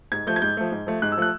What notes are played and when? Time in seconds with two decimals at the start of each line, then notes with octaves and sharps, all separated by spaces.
0.12 G#2 G#6
0.27 F3 A3 G6
0.36 G#6
0.42 G#2 G6
0.57 F3 A3
0.72 G#2
0.87 F3 A3
1.02 G#2 F#6
1.12 E6
1.17 F3 A3 F#6